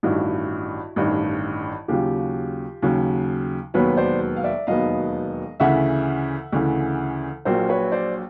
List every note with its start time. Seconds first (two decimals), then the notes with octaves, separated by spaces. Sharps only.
0.03 A1 G2 D#3 E4 F#4
0.96 A1 G2 D#3
1.88 D#2 C#3 F#3 F4 G4
2.82 D#2 C#3 F#3
3.74 E1 D#2 D#3 F#3 B3 B4 C#5
3.97 C5 D5
4.36 F5
4.44 D5 E5
4.67 E1 D#2 D#3 F#3 B3 D#5 F5
5.60 D2 C#3 E3 E5 F#5
6.52 D2 C#3 E3
7.45 A#1 A#2 F#3 A#4 C5
7.69 B4 C#5
7.92 C5 D5